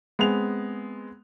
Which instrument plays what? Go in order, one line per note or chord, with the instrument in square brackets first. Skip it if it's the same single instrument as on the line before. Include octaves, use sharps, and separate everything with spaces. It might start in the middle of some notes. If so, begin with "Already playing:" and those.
[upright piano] G#3 B3 C4 F7